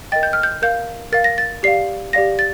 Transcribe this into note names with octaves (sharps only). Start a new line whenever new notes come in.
A#4 D#5 G5 A6
G6
F6
G6
A#4 F5 G6
A#4 F5 A6
A#6
A6
G4 D5 F5 C7
G4 D5 F5 A#6
A6